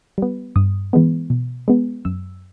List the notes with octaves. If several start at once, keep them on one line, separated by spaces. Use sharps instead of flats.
G3 B3
G2 D#6
E3 G#3 B3
B2
G#3 B3
F#2 E6